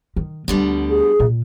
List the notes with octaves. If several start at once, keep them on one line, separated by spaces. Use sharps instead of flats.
D#3
D2 B2 D3 G3 A3
G#4
A#2